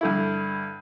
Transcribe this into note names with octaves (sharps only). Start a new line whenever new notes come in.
G2 D3 E4